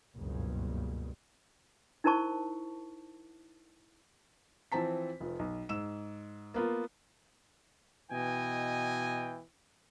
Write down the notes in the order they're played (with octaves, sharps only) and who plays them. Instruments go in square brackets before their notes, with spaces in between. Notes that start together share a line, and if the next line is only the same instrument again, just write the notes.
[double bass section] F#1 C#2 G2 B2
[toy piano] D#4 E4 A#4 C5 A5 C#6
[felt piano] E3 F3 C4 A5 B6
F1 F3
B1
G#2 E6 E7
A#3 B3 F4
[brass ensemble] B2 E3 D#5 G5 G#5